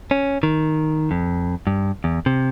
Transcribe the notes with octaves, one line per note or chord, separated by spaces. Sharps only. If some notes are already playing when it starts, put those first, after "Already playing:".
C#4
D#3
F2
G2
E2
C3